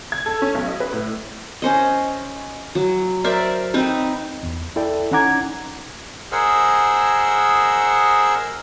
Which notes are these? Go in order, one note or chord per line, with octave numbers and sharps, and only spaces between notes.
G#6
A4
C#4
B1
D#5
B4
A2
C#4 C5 D#5
F#3
A#4 C5 D5 E5
C4 D#4 B4
E2
E4 A4 D5 G5
C#4 D#4 F#5 A#5 D6 G#6
G#4 A#4 C5 D#5 F#5 E6